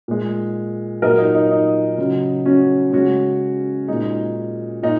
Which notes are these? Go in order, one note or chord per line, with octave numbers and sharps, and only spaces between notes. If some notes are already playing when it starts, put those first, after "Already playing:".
A#2 G#3
A#2 F#3 A#4 D#5
D#4
D#4
D#4
C#3 F#3
C#4 F#4
C#3 G#3 C#4 F#4
A#2 G#3 D#4
A#2 D#4